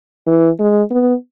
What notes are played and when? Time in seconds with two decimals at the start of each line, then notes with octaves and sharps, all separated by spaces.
0.27 E3
0.60 G#3
0.91 B3